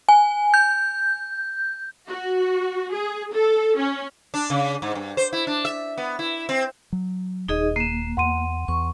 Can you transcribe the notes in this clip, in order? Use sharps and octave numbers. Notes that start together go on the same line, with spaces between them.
G#5
G6
F#4
G#4
A4
C#4
D4
C#3
G#2
G2
C5
E4
D4
E5
B3
E4
C4
F#3
D#1 D#4 G#4 D#5
A#3 C7 E7
E2 F#5 C6 D#7
E2 C#6